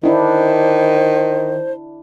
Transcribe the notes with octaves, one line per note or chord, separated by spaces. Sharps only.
D#3 D4 E4 C5